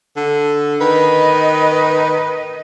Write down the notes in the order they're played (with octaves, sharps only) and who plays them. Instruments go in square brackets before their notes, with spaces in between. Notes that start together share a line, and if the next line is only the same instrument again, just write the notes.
[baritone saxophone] D3
[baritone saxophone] D#3 [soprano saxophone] B4 [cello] D#5